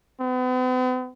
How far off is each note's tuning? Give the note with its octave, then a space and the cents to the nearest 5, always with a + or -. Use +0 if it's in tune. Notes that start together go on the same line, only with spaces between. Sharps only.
B3 +45